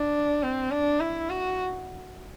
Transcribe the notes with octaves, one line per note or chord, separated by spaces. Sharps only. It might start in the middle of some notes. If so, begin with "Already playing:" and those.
Already playing: D4
C4
D4
E4
F#4